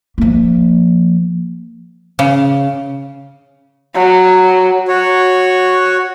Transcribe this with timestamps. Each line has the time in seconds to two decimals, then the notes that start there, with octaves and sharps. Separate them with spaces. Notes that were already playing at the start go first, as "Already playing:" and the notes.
0.18 F3 A#3
2.19 C#3
3.94 F#3
4.88 F#4 C#5